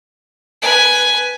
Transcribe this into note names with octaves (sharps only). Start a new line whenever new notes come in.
B4 G#5